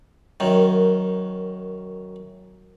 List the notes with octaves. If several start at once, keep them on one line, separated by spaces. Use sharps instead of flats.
F#2 D#3